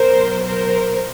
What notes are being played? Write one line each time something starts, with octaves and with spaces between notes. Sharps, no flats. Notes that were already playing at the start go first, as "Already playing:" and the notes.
Already playing: B2 F#3 B3 A#4 C5
A#4 C5